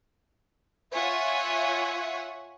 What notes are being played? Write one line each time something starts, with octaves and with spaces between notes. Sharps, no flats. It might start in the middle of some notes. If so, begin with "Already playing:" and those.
F4 C#5 E5 F#5 G#5